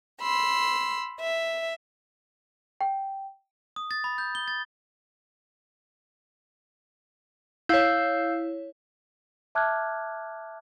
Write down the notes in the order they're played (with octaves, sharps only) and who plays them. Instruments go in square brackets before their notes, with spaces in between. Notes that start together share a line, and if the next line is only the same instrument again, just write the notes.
[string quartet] B5 C6 E6
E5
[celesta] G5
[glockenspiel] D#6
A6
B5
G6
G7
A6
[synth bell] E4 C#5 [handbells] F5 E6 G6
[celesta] E5 A5 D6 F6 F#6 G#6